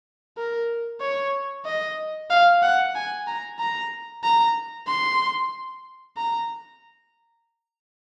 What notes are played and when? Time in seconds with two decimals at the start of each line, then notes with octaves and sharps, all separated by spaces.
0.37 A#4
1.01 C#5
1.65 D#5
2.30 F5
2.63 F#5
2.95 G#5
3.27 A#5
3.59 A#5
4.24 A#5
4.87 C6
6.17 A#5